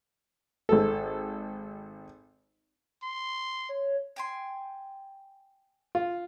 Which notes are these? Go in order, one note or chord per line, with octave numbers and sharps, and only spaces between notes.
G#1 A4
C6
C#5
G5 G#5 C6
F4